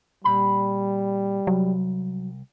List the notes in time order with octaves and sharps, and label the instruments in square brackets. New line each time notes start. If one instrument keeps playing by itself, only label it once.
[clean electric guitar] A#2 B5 [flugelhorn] G3
[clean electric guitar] C2 [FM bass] F#3